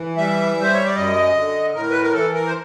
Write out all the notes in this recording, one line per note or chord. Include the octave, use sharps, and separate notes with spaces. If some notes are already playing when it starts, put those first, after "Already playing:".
Already playing: E3
G3 E5
G3
C5
C#5
D5
F#2 D#5
D3
A2 A#4
B4
A#4
E3 A4
A#4
C5